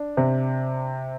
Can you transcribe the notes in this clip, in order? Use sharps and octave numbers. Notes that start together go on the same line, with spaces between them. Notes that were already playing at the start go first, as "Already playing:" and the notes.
Already playing: D4
C3